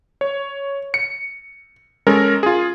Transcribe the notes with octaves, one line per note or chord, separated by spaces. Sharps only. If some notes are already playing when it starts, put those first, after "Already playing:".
C#5
C#7
G#3 C#4 A4 A#4
F4 G#4